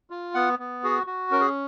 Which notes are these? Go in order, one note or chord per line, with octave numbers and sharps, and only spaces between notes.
F4
B3 F#5
B3
F#4 G#4
F#4
C#4 A#4
G#4